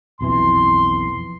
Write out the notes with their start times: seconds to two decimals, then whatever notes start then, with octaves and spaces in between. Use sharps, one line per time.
0.21 B1 F2 E3 C6